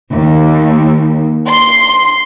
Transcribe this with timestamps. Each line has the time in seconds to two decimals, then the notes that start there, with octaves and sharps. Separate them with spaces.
0.14 D#2
1.48 C6